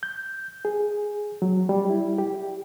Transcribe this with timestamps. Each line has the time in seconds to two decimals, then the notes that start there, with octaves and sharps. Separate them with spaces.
0.03 G6
0.65 G#4
1.42 F#3
1.69 G3
1.90 E4
2.18 G4